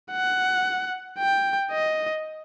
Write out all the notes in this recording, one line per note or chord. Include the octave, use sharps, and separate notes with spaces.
F#5
G5
D#5